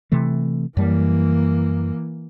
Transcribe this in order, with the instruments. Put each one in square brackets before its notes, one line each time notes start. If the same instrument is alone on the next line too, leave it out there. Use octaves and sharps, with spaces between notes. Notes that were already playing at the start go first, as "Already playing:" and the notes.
[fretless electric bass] C3 E3 A3
[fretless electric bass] F#2 G3 [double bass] E3 A#3